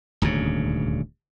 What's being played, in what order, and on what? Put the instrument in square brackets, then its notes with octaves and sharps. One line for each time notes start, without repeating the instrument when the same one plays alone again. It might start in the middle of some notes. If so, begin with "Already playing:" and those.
[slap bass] D#1 D2 G#2 C#3